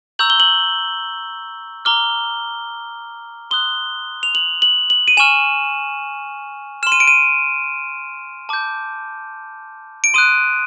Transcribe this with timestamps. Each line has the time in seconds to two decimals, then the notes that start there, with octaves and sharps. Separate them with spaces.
0.19 A#5 C#6 E6 G6 F#7
0.30 G7
0.40 F#7
1.85 A#5 D6 F6 G7
3.51 C6 D#6 F#6 G7
4.23 F7
4.35 F#7
4.62 F#7
4.90 F#7
5.08 D#7
5.17 G#5 C#6 F6 E7
6.83 F6 E7
6.87 C6
6.92 D#7
7.00 D7
7.08 D#7
8.49 A5 D6 G6
10.04 D7
10.14 C6 D#6 F#6 D#7